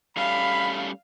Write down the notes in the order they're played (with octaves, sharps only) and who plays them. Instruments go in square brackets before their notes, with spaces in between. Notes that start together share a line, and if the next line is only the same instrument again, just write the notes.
[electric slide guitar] G3 A3 C#4 [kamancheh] F5 [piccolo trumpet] B5